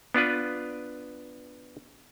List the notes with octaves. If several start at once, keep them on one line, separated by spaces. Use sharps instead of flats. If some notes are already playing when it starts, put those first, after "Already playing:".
B3 D4 F4 B4